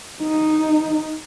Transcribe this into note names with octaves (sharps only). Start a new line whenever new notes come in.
D#4